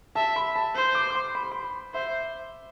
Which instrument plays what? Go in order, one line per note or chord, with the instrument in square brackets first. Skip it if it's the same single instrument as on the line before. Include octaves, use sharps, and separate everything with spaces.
[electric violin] E5 [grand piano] A5
[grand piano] B5
A5
[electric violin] C5
[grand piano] D6
D6
C6
B5
C6
B5
[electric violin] C5 [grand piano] E5